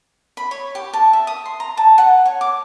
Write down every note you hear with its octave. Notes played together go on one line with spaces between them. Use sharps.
B5
C#5
G4
A5
E5
D#6
C6
A#5
A5
F#5
C#5
D6